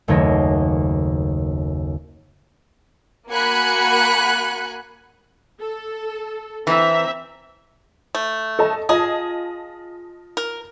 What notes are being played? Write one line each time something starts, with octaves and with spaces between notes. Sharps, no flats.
F#1 D#2 A3 C#5 A#6
A#3 F#4 G#5 B5 F#6 C#7
A4
E3 C4 E5 A#5
A3
A4 D#5 A5
F4 G#4 D#5 A5
A#4